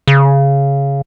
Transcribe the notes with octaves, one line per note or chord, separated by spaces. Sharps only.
C#3